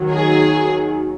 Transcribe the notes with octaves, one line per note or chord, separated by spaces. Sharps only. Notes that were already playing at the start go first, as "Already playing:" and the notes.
Already playing: D#2 D#3 F#3
G#4